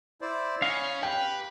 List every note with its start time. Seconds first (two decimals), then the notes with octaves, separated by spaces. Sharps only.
0.21 E4 C5 D5
0.62 C#4 D#5 F5 B5 C#6
1.03 G4 B4 G5